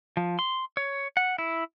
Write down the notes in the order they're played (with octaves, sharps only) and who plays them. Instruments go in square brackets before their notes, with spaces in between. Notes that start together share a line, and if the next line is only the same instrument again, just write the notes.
[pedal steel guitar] F3
C6
C#5
F#5
E4